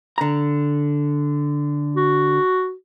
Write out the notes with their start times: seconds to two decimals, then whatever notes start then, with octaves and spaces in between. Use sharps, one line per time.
0.18 D3 A#5
1.96 F#4